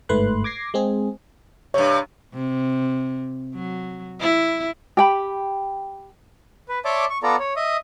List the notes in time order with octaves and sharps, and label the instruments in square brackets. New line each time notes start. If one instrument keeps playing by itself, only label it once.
[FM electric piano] G1 G#2 A3 B4 C6 F#6
D6 G#6 A#6 C7
G#3 C4 G#4
[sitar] G2 C3 [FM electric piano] C#5
[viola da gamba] C3
F#3
E4
[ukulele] G4 G5 B5
[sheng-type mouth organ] B4
C#5 D5 E5 A5 C6 D6
C#6
B3 F4 A4 D5 A#5
C#5
D#5 E5 D#6